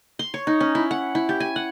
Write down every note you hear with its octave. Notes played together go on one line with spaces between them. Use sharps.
C6
C#5
D#4
C#4
E4
F#5
E4
G4
G#5
F#5